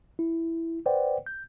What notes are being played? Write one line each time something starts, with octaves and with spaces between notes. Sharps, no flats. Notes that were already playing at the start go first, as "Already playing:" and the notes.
E4
B4 C5 D5 F#5 G5
G6